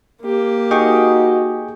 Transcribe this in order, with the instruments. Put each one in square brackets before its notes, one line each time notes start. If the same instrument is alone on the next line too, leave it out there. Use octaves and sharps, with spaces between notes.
[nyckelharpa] A#3 G4
[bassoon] D#4 [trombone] F#4 [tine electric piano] G#4 G5 C#6